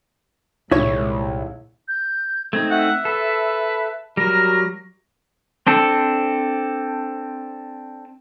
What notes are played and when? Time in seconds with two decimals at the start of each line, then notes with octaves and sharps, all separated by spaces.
0.71 C2 A#2 D#3 G#3 E4 C#5
1.88 G6
2.53 A3 C4 D#4 G#6
2.71 E5 F#5
3.05 A4 B4
4.17 F#3 G3 A#4 A#6
5.67 C4 D4 A4